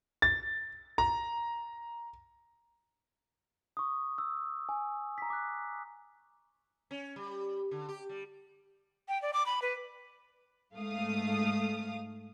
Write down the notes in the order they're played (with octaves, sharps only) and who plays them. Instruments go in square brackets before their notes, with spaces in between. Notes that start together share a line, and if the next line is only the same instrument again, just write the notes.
[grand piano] A6
A#5
[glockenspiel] C#6 D#6
E6
G#5
A#5 B6
D6 F#6
[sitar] C#4
G3
D3
G4
G3
[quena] G5
D5
D6
B5
B4
[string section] G#2 A3 F5 D#6